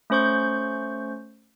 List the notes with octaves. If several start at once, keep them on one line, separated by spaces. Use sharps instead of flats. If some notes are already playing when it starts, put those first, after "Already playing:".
A3 C#4 C5 C#6 G6